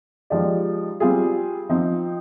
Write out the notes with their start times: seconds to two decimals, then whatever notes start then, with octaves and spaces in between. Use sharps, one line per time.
0.30 F3 G#3 D#4 G4 D5
1.00 G3 C4 F4 G#4
1.69 F3 C4 D#4